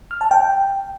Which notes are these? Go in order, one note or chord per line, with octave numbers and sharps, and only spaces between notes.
F6
A5
G5